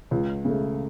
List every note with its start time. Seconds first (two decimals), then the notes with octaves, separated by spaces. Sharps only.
0.11 C#2
0.45 C#3 A3